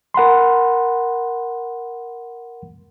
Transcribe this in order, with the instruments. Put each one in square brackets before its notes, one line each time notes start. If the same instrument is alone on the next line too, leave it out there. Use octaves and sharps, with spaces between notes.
[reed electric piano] A#4 F#5 B5 C6